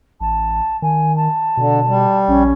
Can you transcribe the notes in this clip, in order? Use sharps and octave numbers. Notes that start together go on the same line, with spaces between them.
A1 A5
D#3 G#5
A5
B2 D3
G3
A#1 C#4